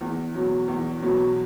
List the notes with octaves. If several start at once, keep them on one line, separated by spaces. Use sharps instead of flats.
E2
B2 F#3
E2
B2 F#3